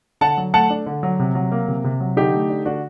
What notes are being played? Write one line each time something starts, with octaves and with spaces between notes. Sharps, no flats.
D3 F#5 A5
F#3
A3 F#5 A5
D4
D3
F#3
C3
F#3
A#3
C3
C3
F#3
D3 D#4 G4
A3
D4
D3 D4 F#4